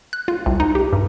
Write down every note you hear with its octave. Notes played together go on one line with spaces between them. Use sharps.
F#6
F4
C2
D#4
G4
G2